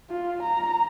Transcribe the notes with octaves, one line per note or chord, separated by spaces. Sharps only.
F4
A#5